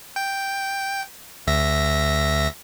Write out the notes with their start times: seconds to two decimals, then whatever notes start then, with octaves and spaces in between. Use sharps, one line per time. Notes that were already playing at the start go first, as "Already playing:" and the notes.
0.16 G5
1.47 D2 E5 A#6